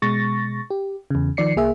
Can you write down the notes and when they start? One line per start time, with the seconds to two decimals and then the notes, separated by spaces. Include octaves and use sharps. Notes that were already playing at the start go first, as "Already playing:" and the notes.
0.02 B2 G#3 C#6 A6 A#6
0.70 G4
1.10 E2 C#3
1.37 D#3 F3 D5 C7 C#7
1.56 C2 A#3 G#4 E5